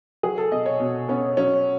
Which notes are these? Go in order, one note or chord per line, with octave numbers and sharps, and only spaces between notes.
F#3 G#4
A4
B2 D#5
C#5
B2
B3 C#4
F#3 C#4